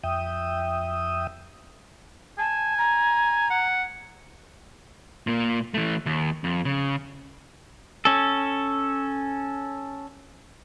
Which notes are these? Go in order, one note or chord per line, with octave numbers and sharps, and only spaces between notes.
F2 E5 G5 D#6
G#5 A5
A#5
F#5
A#2 A#3
E3 A3
D#2
F2
C#3
C#4 A4